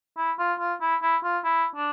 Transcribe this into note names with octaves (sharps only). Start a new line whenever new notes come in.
E4
F4
F4
E4
E4
F4
E4
D4